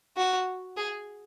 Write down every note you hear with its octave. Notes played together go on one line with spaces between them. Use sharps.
F#4
G#4